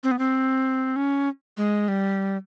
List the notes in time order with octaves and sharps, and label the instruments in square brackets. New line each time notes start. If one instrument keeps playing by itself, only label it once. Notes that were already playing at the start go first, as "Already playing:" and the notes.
[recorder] C4
B3
C4
C#4
G#3
G3